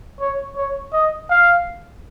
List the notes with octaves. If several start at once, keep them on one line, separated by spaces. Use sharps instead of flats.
C#5
C#5
D#5
F5